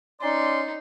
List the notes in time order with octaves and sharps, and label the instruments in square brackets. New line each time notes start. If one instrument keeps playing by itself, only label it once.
[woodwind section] C#4 D5 C6 [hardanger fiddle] D#4